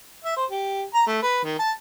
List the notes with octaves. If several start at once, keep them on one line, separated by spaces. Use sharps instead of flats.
E5
C5
G4
A#5
A3
B4
D#3
A5